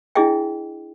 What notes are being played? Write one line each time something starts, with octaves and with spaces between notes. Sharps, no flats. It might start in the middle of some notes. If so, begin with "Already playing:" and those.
D4 E4 G#4 D#5 E5 G5